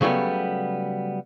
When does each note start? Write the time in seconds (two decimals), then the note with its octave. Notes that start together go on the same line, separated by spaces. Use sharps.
0.01 C#3 F#3 G3 A3 B3